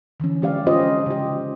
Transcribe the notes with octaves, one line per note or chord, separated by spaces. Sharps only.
D3 E3 F3 C#4
G#3 G4 D5 F5
C#4 F4 G4 C5 D#5
C#3 G4